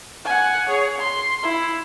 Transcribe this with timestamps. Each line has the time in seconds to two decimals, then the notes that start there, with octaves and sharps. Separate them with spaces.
0.25 F#5 G#5
0.68 G#4 C#5
0.98 C6
1.43 E4